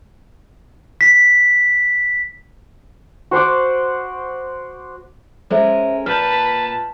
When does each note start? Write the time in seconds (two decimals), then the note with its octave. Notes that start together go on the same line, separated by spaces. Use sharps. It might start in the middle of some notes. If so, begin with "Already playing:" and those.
1.01 B6
3.31 F#4 C5 F#5 D6
5.50 G#3 C#4 A4 A#4 C5 E5
6.06 A#2 B4 A5 F6 G6